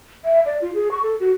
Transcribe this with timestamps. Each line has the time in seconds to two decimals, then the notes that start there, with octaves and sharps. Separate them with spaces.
0.25 E5
0.46 D5
0.62 F4
0.75 G#4
0.91 C#6
1.03 A4
1.20 F#4